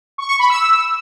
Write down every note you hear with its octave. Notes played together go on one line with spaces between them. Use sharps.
C#6
C#6
B5
E6